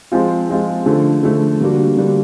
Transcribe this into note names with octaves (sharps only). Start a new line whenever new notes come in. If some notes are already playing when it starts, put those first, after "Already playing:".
F3 G#3 C4 F4
F3 G#3 C4 F4
D3 F3 A3
D3 F3 A3
D3 G3 A#3 D4 F#4
D3 G3 A#3 D4 F#4